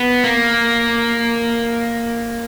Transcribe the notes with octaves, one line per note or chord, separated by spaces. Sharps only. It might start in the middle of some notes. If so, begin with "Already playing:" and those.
Already playing: B3
A#3